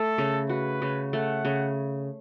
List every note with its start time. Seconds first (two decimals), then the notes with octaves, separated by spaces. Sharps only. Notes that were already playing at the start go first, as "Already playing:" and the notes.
Already playing: A3 A4
0.18 C#3
0.49 F#4 B4
0.82 C#3
1.13 A3 F#5
1.45 C#3